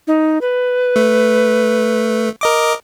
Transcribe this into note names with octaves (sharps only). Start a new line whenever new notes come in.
D#4
B4
A3
A#4 D#5 D6